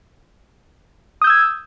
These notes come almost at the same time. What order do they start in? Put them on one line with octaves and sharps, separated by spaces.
D#6 G6 E6 G#6